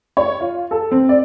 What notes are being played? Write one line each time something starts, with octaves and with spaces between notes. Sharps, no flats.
C#5
F4
A4
C4
D5